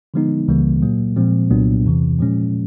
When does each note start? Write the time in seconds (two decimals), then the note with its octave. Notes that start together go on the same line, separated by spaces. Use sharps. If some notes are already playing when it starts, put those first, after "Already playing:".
0.14 D3 F3 G#3 B3 D#4
0.48 C#2 C#3 E3 G3 A#3
0.82 A#2 F#3 A#3
1.16 A#2 F3 G#3 C4
1.50 C2 A#2 F#3 B3 D4
1.85 E2 C3 E3
2.19 A#2 F3 G#3 C#4